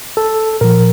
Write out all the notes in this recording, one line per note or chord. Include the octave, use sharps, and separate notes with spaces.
A4
A#2 F3 A#4